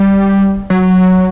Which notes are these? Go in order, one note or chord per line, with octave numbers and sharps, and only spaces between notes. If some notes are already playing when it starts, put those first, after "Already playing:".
Already playing: G3
F#3